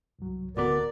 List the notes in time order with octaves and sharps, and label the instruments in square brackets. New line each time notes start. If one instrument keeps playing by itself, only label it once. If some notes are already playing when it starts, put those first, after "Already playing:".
[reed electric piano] C2 G2 F#3
[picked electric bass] D1 D3 B3 [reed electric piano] F#4 A4 D6 [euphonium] A#4 [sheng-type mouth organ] D5